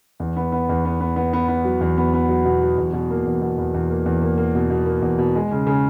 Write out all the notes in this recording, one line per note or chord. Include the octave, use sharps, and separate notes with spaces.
E2
B3
B3
E2
B3
B3
B3
B3
B3
F#3
E2
B3
B3
F#3
B2
F#3
E2
B2
A#3
E2
B2
E2
E2
A#3
E2
A#3
A#3
B2
B2
A#3
E2
B2
G#3
C#3
C#3